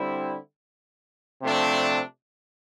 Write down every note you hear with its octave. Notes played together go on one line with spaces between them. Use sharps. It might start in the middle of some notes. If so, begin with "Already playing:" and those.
Already playing: D3 G3 C4 E4
C3 F3 A3 D4